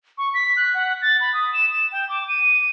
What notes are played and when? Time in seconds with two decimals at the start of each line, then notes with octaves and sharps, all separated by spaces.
0.18 C#6
0.34 B6
0.57 F#6
0.74 F#5
1.02 A6
1.21 B5
1.34 D#6
1.54 E7
1.73 E7
1.92 G5
2.09 D6
2.28 D#7